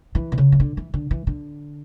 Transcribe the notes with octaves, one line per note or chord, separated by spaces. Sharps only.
E3
B2
C#3
E3
D3
E3
D3
E3
D3